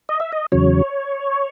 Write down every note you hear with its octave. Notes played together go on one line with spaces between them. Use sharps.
D#5
E5
D#5
E2 C#3 F#3 C#5